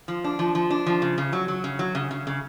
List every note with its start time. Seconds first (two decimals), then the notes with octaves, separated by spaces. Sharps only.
0.08 F3
0.24 D4
0.39 F3
0.55 F3
0.70 D4
0.87 F3
1.02 C#3
1.18 C#3
1.33 F#3
1.48 F#3
1.64 C#3
1.79 F#3
1.95 C#3
2.11 C#3
2.27 C#3